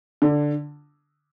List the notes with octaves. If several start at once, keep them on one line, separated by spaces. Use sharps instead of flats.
D3